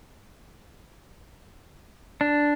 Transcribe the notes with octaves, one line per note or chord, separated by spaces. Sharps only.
D4